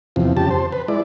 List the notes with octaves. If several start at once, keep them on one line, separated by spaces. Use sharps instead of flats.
E2 C3 F3
F2 C#3 G4 A5
C5
B4
G#3 E4 D5